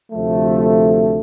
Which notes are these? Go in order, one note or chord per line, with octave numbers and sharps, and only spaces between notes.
D2 C3 F3 A3